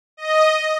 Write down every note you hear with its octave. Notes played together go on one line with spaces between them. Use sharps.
D#5